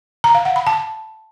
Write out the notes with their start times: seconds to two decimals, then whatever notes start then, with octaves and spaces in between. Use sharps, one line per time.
0.24 A#5
0.35 F5
0.45 F#5
0.56 B5
0.67 A5